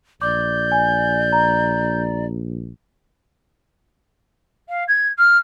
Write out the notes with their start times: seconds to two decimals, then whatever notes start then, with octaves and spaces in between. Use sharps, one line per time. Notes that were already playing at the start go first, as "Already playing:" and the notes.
0.22 A#1 D5 D6 G6
0.72 G#5
1.33 A#5
4.68 F5
4.88 G#6
5.18 F6